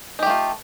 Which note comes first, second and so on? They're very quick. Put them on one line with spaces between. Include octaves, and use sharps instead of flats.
D#4 G4 A3 F4